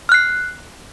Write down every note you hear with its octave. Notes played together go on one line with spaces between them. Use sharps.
F6 F#6 C7